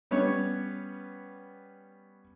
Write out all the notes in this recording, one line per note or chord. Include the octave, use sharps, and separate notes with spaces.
G3 B3 C#4 C#5